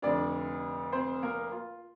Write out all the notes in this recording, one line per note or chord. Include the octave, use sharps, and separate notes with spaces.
F1 F2 D3 D4 D5
C4 C5
A#3 A#4
F4